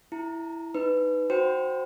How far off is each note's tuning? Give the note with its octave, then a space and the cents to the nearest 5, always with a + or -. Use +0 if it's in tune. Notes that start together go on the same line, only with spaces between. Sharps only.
E4 +0 A#5 +0
D#4 +0 B4 +10
F#4 +0 C5 +0 G5 +0